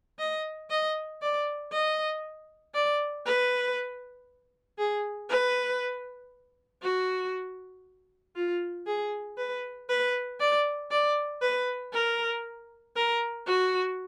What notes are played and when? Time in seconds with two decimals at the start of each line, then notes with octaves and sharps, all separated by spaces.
0.19 D#5
0.70 D#5
1.22 D5
1.72 D#5
2.74 D5
3.26 B4
4.78 G#4
5.29 B4
6.83 F#4
8.36 F4
8.87 G#4
9.38 B4
9.89 B4
10.40 D5
10.91 D5
11.42 B4
11.93 A#4
12.96 A#4
13.47 F#4